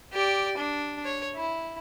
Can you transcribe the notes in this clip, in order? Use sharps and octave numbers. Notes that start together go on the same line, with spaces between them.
G4 D5
D4
C#5
E4